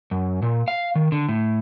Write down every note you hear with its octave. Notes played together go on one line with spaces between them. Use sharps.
F#2
A#2
F5
D#3
D3
A2